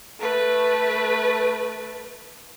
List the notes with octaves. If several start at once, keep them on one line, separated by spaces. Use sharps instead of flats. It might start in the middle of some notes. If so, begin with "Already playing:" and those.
A3 B4